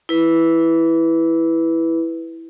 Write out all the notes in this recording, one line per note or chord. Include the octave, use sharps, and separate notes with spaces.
E4 B4